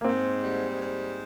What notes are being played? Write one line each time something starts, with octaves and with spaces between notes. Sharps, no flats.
A#3
G#2 C4
G3
G#2